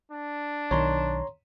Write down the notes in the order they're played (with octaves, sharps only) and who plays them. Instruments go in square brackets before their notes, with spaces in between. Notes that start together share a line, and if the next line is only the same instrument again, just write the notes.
[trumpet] D4
[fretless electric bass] B1 D#3 [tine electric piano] C#5 A#5 C6